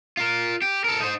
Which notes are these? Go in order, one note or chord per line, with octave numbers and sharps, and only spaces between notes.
F4 A#4
G4
A4 A#4
D#4 C5